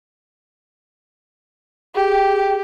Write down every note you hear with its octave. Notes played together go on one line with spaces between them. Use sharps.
G4 G#4 G5